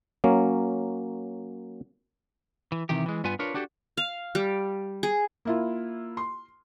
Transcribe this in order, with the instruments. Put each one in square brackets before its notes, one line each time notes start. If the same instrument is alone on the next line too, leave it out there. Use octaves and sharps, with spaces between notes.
[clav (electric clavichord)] F#3 A#3 C#4
[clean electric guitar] E3
C3 D#3 E3 G4
E3 G#3
G2 B3 F4 B4 G#5
D4 F4 A#4 B4 C#5
D4 F#4 G4 A4
[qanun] F5
G3
G#4
[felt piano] A#3 E4 F4
C6